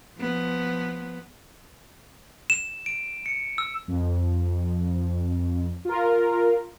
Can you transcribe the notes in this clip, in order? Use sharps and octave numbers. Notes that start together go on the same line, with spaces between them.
F3 B3
E7
D7
C#7
E6
F2
F4 A#4